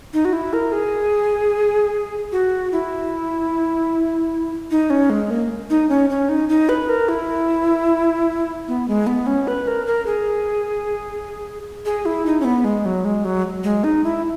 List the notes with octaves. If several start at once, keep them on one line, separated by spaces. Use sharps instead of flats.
D#4
F#4
E4
A#4
G#4
F#4
E4
D#4
C#4
G#3
A#3
D#4
C#4
C#4
D#4
D#4
B4
A#4
E4
B3
G#3
B3
C#4
B4
A#4
A#4
G#4
G#4
E4
D#4
C#4
B3
G#3
F#3
G#3
F#3
G#3
D#4
E4